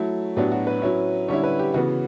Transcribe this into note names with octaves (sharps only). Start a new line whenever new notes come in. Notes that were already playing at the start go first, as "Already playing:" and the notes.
Already playing: F#3 A3 E4
A2 F#3 B3 D4 G4
F#4
B4
F#3 C#4 E4
D3 G3 C#4 E4 C#5
B4
G4
C#3 E3 B3 F#4